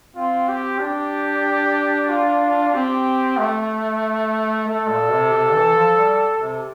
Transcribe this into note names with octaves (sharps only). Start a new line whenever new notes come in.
C4 F4
G4
D4 G4
F4
C4 G4
A3
A3 A4
A#2
C3
C3
E3
F3
G3
C3